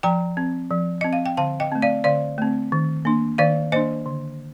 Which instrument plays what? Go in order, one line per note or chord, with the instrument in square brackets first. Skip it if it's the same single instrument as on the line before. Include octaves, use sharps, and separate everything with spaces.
[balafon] F3 G5 A#5
C4
F3
C4 D#5
F5
G5
D3 F5 A5
D#5 G5
A3 C4
D5 F5
D3 D5 F5
A3 C4
D#3
A#3 D4
D#3 D5 F5
A#3 D4 C5 D#5
D3